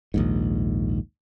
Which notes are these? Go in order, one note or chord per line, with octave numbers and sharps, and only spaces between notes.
A#1 D#2 G#2